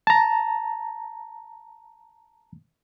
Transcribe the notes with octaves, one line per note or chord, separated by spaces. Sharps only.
A5 A#5